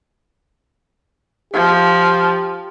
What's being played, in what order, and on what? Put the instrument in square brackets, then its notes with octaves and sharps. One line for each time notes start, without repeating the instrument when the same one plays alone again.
[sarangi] F3 [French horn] G4